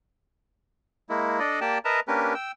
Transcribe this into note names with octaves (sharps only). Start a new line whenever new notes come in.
G#3 A#3 E4
D4 A4 D5 D#5
A#3 G4 D5 G5 A5
A#4 B4 D#5 E5 A5 A#5
A#3 C#4 D4 G4 A#4 B4
G5 E6